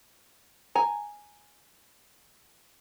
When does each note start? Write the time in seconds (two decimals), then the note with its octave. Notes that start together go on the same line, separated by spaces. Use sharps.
0.75 G#5 A#5